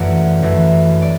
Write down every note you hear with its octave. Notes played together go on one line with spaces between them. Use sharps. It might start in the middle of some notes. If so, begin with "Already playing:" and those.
Already playing: F#2 E3 A3 D5 F#5
F#2 E3 A3
D5